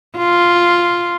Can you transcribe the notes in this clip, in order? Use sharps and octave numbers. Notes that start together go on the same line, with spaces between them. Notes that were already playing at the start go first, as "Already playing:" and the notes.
F4